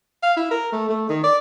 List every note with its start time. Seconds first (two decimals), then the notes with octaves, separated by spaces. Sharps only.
0.23 F5
0.37 E4
0.51 A#4
0.72 A3
0.89 A3
1.09 D#3
1.23 D5